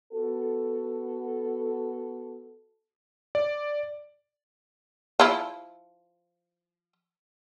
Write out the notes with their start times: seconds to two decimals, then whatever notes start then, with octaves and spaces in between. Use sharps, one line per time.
0.12 B3 F#4 A4
3.35 D5
5.20 F3 E4 F4